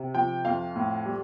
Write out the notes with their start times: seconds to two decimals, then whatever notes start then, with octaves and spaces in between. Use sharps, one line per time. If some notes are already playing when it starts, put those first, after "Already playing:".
Already playing: C3
0.14 F3 G5
0.45 F2 F5
0.76 A2
1.06 G3